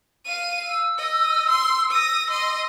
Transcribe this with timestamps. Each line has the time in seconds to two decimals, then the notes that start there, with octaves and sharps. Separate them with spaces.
0.25 F5 D#7
0.64 E6
0.97 D#5
1.49 C6
1.91 D#6 A#6
2.30 D#5 C6